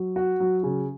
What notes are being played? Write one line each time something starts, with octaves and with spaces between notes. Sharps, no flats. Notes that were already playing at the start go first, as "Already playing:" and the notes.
Already playing: F#3
F#4
F#3
C#3